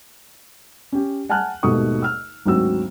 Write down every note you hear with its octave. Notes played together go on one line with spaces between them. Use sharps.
C#4 G4
F#5 G#5 A5 F6 F#6
G#1 D#2 B2 A3 C#6 D#6
E6 F6
G#1 D2 F#3 C4 F#4 E6